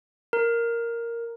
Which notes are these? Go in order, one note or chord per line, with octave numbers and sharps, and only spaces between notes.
A#4